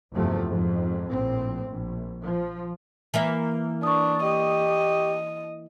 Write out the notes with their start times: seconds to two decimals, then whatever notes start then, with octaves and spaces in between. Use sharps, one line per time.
0.13 F1 E2 G2 C3 F3 A3
0.45 F2 G#2
1.10 A#1 A2 C4
1.66 A#1
2.21 F3
3.14 E3 A#3 E5
3.83 D4 C#6 D#6
4.23 G4 D#5